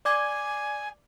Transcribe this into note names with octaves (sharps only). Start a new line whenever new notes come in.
D5 G#5 D6 G#6